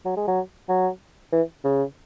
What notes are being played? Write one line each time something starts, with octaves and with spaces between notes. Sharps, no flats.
F#3
G#3
F#3
F#3
E3
C#3